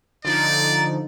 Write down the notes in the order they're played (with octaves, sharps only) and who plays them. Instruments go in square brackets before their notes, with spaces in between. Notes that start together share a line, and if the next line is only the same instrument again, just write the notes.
[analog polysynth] D3 F3 D#4 [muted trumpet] D5